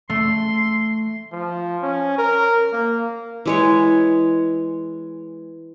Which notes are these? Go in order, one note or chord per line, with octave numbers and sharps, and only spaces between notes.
A3 C6
F3
C#4
A#4
A#3
E3 G#3 C#5